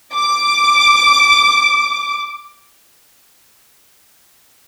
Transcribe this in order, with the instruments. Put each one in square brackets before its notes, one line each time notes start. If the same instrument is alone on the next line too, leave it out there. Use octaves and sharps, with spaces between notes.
[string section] D6